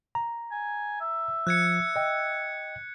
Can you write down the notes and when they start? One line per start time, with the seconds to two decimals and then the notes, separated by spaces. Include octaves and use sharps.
0.15 A#5
0.51 G#5
1.01 E5
1.47 F3 F#6 G#6 C#7
1.96 D#5 G5